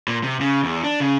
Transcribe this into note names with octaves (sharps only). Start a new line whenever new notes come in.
A#2
C3
C#3
E2
D4
C#3